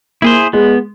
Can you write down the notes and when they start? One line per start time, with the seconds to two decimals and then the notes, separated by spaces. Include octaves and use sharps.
0.22 A#3 E4 G#4 C5
0.53 G#3 B3